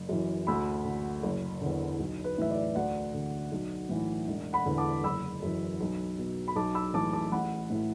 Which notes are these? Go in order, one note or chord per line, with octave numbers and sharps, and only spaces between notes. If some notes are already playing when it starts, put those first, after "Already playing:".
Already playing: F#1
F#2 E3
D2 B5 E6
D3
F#1
E2 D3
B1
B4
A2 E3 E5
D5
D2 D5 F#5
D3
B1
A2 E3
E1
F#5 B5
E2 D3
A5 D6
F#1 B5 E6
F#2 E3
B1
B2
B5
B1 A5 D6
B5 E6
A2 E3 A5 D6
A5 D6
A1 F#5 B5
A2 E3